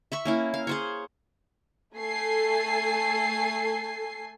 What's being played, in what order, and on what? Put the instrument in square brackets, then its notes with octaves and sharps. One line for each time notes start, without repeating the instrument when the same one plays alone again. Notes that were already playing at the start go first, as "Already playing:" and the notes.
[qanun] E5 B5 C#6
A#3 C#4 E4
F5
G#4 C5 C#5
[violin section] A3 A4 G#5 C7